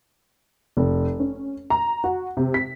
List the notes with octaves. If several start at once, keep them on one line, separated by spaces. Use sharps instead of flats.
F1
C#4
A#5
F#4
C3
B6